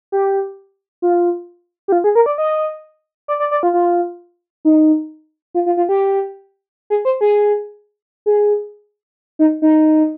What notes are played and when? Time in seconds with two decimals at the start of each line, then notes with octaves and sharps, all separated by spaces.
0.12 G4
1.02 F4
1.88 G4
1.92 F4
2.04 G#4
2.15 A#4
2.26 D5
2.38 D#5
3.28 D5
3.40 D5
3.51 D5
3.63 F4
3.74 F4
4.65 D#4
5.54 F4
5.66 F4
5.77 F4
5.89 G4
6.90 G#4
7.05 C5
7.21 G#4
8.26 G#4
9.39 D#4
9.62 D#4